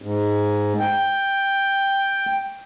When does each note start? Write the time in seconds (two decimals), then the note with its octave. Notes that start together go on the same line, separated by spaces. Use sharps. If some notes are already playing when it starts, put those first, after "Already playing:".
0.02 G#2
0.80 G5